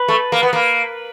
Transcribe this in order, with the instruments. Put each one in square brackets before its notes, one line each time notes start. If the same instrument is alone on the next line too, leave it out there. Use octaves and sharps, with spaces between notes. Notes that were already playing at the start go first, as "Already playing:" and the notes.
Already playing: [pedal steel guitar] B4
[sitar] A3
A#3
B3
A#3